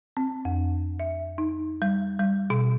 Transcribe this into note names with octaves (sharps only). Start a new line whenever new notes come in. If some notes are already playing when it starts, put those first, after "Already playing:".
C4
F2
E5
D#4
G3
G3
B2